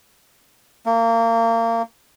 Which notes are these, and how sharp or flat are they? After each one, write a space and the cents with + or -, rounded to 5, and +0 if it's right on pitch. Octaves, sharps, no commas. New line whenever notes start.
A#3 -30